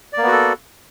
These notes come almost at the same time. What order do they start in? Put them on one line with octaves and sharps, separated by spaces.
D5 A#3 B3 F#4 A4